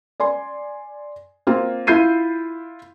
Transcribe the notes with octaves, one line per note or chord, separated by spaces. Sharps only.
D5 G#5 C6
A#3 C4 F4
E4 F4 G6 C7 D#7